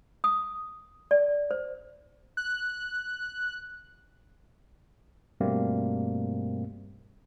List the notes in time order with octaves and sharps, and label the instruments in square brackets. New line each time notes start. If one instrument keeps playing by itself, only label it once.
[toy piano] D#6
D5
C5
[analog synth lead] F#6
[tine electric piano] G2 B2 G3 A3 A#3 C4